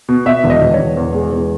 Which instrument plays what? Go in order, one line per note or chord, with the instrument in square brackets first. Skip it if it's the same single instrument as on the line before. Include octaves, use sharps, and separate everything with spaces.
[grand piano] B2
B2 E5
E1
D#5
E1
C#5
E1
E2
G#3
E2